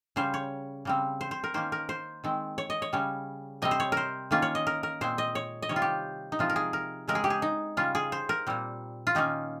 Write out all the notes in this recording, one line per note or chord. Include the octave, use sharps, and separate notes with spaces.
C#3 G3 C#4 C5
C#5
C#3 G3 C4
C5
C5
A#4
D#3 A#3 C#4 C5
A#4
C5
D#3 G#3 C4
C#5
D#5
C#5
C#3 G3 C#4
C3 G3 C4 D#5
C5
C#5
A#4 C5
D#3 A#3 C#4 F4
C#5
D#5
A#4
A#4
A#2 G#3 C4 C5
D#5
C#5
D#5
C3 D#3 G3 C#5
F4
G4
D#4
C3 F3 G#3 F4
A#4
G#4
A#4
C#3 G#3 C4 A#4
G#4
G4
G#4
D#4
C#3 G3 C#4 F4
G#4
C5
A#4
A#2 G3 C4
F4
D#3 A#3 C#4 D#4